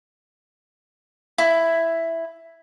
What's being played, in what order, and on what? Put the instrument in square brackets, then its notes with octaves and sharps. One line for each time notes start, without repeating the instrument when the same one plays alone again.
[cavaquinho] E4